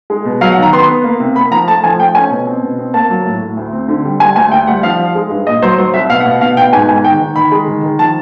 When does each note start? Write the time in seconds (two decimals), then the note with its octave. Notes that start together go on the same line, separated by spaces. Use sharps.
0.10 G#3
0.25 B2
0.41 F#3 F5
0.52 F#5
0.57 D#3
0.63 A#5
0.73 B3 C6
0.89 B3
1.04 A#3
1.20 C3
1.36 A#3 B5
1.51 F3 A#5
1.68 A3 A5
1.84 F3 G#5
1.99 A3 G5
2.15 C#4 G#5
2.31 B2
2.47 C4
2.62 B2
2.79 C4
2.94 A#3 A5
3.10 F#3
3.25 A2
3.41 A2
3.57 D2
3.73 C4
3.88 D3
4.05 G3
4.20 G3 G#5
4.36 D2 G#5
4.52 D2 G5
4.67 G3 F#5
4.83 F3 F5
4.99 F3
5.15 G#3
5.30 G2
5.47 A#2 D#5
5.62 F#3 C5
5.78 F#3 C5
5.94 C2 E5
6.09 B2 F5
6.20 F#5
6.26 B2
6.31 F#5
6.41 B2 F5
6.57 B2 G5
6.72 G#2 G#5
6.89 G#2 G#5
7.04 D#3 G5
7.20 D#3
7.36 D#3 B5
7.52 G#3
7.67 D#3
7.83 D#3
7.99 F3 A5